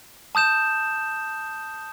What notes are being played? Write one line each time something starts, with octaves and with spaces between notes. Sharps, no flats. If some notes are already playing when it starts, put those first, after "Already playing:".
A5 D#6 G6 E7